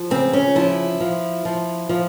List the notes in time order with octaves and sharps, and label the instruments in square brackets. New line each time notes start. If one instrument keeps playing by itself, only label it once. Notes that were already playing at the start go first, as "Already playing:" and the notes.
Already playing: [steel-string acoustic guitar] F3
C#3 C4
C#4
F3 E4
F3
F3
F3